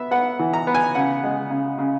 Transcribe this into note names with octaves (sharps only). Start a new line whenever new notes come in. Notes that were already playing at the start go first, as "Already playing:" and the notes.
Already playing: B3 E5
B3 F#5
E3
A#5
B3
G#5
C#3 F#5
G#3
C#3
C#3